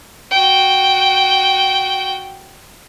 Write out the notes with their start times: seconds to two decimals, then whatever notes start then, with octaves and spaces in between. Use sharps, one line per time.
0.31 F#4 G5